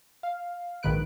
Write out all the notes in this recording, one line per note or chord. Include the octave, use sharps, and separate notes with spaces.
F5
A#1 G#2 D#3 B4 F#6 D7